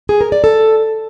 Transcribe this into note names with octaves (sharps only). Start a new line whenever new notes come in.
G#4
A#4
D5
A4